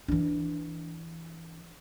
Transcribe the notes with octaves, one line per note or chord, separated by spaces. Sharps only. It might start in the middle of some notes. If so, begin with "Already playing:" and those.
E3 D4